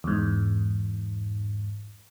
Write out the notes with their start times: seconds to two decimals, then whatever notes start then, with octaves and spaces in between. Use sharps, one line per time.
0.04 E2 G#2